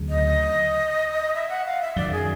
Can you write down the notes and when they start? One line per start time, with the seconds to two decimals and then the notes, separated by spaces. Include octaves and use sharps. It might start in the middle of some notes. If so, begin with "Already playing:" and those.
Already playing: D2 C#3 F#3
0.09 D#5
1.34 E5
1.49 F#5
1.65 F5
1.81 E5
1.96 F#2 D#3 F#3 D5
2.12 G#4